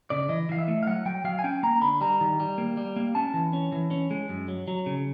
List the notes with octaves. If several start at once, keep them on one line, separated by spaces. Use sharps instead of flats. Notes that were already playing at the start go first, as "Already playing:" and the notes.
C#3 D5
E3 D#5
E3 F5
E5
A3
F5
F#3 F#5
F#3 G5
F#3 F5
G#5
C#4 G5
A#3 A#5
D3 B5
G3 A#5
D#3
G3
A#3
G3
A#3
C#4 A5
E3
C#4
E3
C#4
G#3
F#2
F#3
F#3
C#3